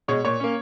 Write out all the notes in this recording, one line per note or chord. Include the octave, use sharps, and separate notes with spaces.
B2 G#3 C#5
A#2 C#5
A#3 C#4